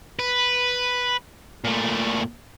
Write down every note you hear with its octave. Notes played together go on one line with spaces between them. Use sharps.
B4
A#2 A3